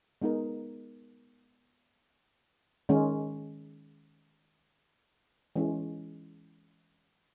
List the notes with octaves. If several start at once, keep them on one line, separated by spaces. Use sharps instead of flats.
G#3 B3 D#4 A#4
D#3 G#3 C#4
E3 G#3 C#4